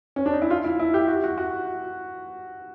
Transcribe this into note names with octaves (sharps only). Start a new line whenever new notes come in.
C#4
D4
D#4
E4
F4
E4
E4
G4
F#4
F#4
F#4